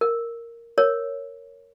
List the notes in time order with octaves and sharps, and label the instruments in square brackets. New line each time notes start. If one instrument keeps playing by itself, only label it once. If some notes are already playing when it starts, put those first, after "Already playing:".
[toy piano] A#4
A#4 C#5